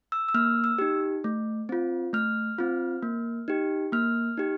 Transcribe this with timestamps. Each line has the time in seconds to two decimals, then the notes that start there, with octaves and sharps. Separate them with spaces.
0.12 E6
0.28 E6
0.34 A#3 F6
0.64 E6
0.78 D#4 G4
1.24 A3
1.69 C4 F4
2.13 A3 F6
2.59 C4 F4
3.03 A#3
3.48 D#4 G4
3.92 A#3 F6
4.37 D#4 G4